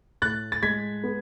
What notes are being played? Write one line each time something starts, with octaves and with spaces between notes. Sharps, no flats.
A2 F#6 A6
A6
G#3 G#6 B6
B3